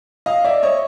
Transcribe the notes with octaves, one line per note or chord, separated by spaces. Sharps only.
D#5 F5
D5 E5
C#5 D#5